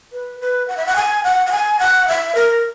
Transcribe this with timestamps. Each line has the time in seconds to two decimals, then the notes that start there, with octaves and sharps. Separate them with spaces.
0.13 B4
0.40 B4
0.68 F#5
0.77 E5
0.86 F#5
0.96 G#5
1.24 F#5
1.47 F#5
1.52 G#5
1.79 F#5
2.08 E5
2.35 A#4